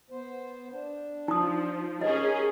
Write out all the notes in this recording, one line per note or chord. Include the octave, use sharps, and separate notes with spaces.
B3 C5
D4
F3 D#4 D#6
C#4 G4 G#4 A#4 D#5